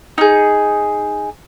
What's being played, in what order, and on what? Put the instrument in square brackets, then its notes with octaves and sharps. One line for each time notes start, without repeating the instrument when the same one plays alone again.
[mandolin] D#4 G#4